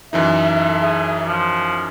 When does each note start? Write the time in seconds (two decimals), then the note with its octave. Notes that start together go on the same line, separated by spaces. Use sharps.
0.13 F#2 E3 D#4 A4 E5
0.82 G#4
1.27 F3